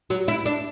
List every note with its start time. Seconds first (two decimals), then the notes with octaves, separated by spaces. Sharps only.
0.10 F#3
0.28 E4
0.46 D4